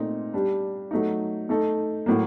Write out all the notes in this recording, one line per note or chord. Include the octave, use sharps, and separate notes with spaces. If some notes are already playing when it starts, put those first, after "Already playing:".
Already playing: A#2 A3 C4 D#4
G3 D4 G4
F#3 A3 D#4
A3 D#4 A4
A2 F#3 A#3